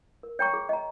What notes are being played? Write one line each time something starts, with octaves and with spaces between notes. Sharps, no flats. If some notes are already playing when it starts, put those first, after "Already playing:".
A#4
C#5 G5 A#5 C#6
G#4
D#5 A#5